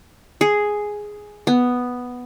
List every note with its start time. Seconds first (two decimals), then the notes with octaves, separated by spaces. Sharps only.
0.41 G#4
1.47 B3